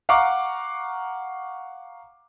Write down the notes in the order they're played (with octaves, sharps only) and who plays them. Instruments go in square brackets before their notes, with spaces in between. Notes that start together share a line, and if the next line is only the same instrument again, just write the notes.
[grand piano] F5 F#5 A#5 C#6 D6